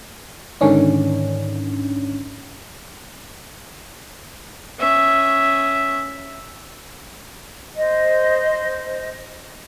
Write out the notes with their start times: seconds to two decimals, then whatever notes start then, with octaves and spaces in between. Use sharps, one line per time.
0.61 G#2 D3 D#3 C#4 D4
4.79 C#4 E5
7.78 C5 D#5